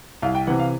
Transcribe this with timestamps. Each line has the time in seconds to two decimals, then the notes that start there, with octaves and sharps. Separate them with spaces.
0.22 C2 F5
0.35 G5
0.47 C3 E3 F#5
0.59 F5